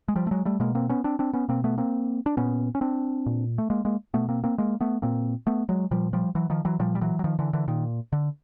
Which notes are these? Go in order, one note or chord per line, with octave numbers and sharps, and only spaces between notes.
G#3
F3 G3
A3
F#3 G#3
G3 A3
B2 G#3 A#3
A#3 C4
B3 C#4
C4 D4
C4 D4
B3 C#4
B2 A#3 C4
A3 B3
A#3 C4
D4
A#2 B3 C#4
C#4
C4 D4
A#2
A3
G#3 A#3
G#3 A#3
B2 A3 B3
A#3 C4
A#3 C4
G#3 A#3
A3 B3
A#2 A#3 C4
A3 B3
F#3 G#3
A#2 F3 G3
F3 G3
E3 F#3
D#3 F3
E3 F#3
A#2 F3 G3
G3
E3 F#3
F#3
D#3 F3
D3 E3
D3 E3
A#2 D#3
D3